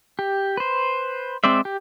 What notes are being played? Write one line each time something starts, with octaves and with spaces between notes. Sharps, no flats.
G4
B4 C5
G#3 C4 C5 D5 E5
G4